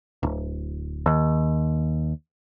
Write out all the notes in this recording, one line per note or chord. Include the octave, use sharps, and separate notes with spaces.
D1
D#2